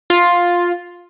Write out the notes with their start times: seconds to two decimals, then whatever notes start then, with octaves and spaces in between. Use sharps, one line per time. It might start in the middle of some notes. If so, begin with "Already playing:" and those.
0.10 F4